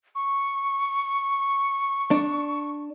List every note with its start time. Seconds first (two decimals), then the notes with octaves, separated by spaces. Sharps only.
0.15 C#6
2.11 D4